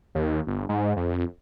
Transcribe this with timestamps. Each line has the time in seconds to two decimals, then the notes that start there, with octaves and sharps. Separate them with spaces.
0.15 D#2
0.47 G1
0.69 G#2
0.97 F2